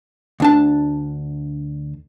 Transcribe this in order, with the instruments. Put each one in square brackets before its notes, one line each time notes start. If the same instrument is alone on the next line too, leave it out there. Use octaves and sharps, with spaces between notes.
[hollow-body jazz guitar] D2 D4 A5